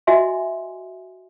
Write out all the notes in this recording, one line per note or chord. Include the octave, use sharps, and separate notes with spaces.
F#4 D#5 E5 G#5 C6